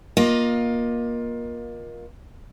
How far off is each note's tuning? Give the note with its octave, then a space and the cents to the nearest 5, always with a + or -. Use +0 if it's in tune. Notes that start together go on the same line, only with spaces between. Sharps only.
A#3 +25 F4 +20 D#5 +0